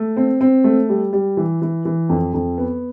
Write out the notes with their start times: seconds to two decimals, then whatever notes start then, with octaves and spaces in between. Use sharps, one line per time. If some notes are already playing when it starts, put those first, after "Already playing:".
Already playing: A3
0.17 C4
0.41 C4
0.64 A3
0.89 G3
1.13 G3
1.37 E3
1.62 E3
1.85 E3
2.09 F2
2.34 F2
2.58 B3